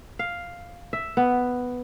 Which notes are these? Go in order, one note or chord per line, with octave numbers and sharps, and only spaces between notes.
F5
E5
B3